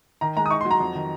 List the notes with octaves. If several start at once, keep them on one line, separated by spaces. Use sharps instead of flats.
D#3 A#5
G#3 A#5
D#6
D#4 C#6
C6
F#3
A#5
F2
D#3